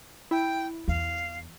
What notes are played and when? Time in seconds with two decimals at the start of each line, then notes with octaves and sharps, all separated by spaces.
0.31 E4 G5
0.88 E2 F5